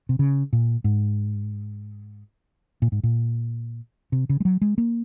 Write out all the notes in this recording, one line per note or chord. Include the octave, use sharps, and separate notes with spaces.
C3
C#3
A#2
G#2
A#2
G#2
A#2
C3
C#3
G#3
F#3
G#3
A#3